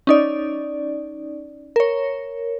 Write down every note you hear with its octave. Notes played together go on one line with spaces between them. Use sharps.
C#4 D#4 D5
A#4 C#5